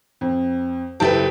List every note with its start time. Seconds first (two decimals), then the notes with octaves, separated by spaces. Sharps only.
0.21 F2
1.00 F#1 E4 G4 A4 B4 A5